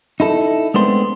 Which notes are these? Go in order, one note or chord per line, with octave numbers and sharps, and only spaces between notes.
D#4 E4 A4
G#3 A3 B3 C4 D4 C5